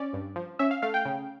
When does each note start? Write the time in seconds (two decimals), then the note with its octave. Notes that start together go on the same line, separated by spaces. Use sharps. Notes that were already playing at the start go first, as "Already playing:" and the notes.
Already playing: C#4 D5
0.13 G2
0.36 F3
0.59 C#4 E5
0.71 F5
0.82 A3 F5
0.94 G5
1.05 C#3